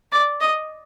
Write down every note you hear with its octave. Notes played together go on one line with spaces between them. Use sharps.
D5
D#5